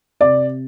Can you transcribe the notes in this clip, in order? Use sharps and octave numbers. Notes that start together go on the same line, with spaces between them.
C3 D5